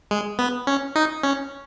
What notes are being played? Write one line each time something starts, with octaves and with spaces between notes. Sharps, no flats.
G#3
B3
C#4
D#4
C#4